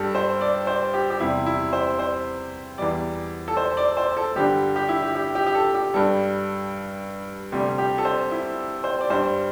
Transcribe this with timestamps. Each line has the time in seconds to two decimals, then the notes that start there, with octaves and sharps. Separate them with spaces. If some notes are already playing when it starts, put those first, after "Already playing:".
Already playing: G2 G3 G4 A4
0.15 C5
0.41 D5
0.67 C5
0.94 G4
1.10 G4
1.20 E2 C3 G3 E4
1.46 E4
1.73 C5
1.99 C5
2.78 E2 E3 G3 D5
3.48 A4
3.57 C5
3.77 D5
3.97 C5
4.17 A4
4.36 G2 D3 G3 G4
4.76 G4
4.89 E4
5.02 G4
5.15 G4
5.35 G4
5.46 G4
5.55 A4
5.74 G4
5.94 G2 G3 A4
7.52 D2 C3 G3 G4
7.78 G4
7.98 A4
8.05 C5
8.31 E4
8.84 C5
9.01 D5
9.10 G2 G3 C5